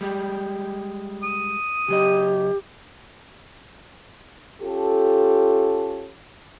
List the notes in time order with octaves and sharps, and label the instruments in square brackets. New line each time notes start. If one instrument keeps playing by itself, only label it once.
[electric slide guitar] G3 G#3 G4
[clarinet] D#6
[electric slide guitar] C#3 F#3 D#5 [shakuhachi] G4
[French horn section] C#4 F4 G4 A4